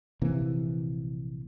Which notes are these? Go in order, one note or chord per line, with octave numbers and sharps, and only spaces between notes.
A#1 C3 E3 A#3